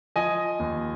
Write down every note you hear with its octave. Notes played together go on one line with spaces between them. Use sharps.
F3 D#5 G#5
D#2